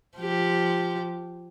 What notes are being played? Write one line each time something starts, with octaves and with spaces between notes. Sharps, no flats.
F3 G4